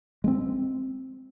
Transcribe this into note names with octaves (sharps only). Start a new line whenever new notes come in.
G#3 A#3 C4